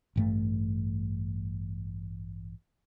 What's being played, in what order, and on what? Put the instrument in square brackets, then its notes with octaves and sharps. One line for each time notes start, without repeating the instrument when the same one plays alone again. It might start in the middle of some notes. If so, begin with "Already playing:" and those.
[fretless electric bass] A1 G2 A3